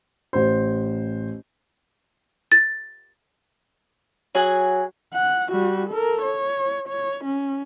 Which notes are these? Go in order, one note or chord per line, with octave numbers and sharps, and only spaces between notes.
A1 C5
A6
F#3 G#4 F#5 G#5
F#5
G3 F#4
A4 A#4
C#5
C#5
C#4